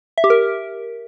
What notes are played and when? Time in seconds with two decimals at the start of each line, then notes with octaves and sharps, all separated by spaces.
0.18 E5
0.24 G4
0.30 A#4